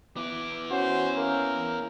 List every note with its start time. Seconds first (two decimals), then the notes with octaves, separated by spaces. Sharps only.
0.17 B3 E4 D6
0.71 C#4 F#4 C5
1.18 A#3 A#4